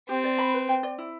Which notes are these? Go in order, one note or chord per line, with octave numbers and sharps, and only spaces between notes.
C4 G4
D5
B5
B4
G5
D5
E4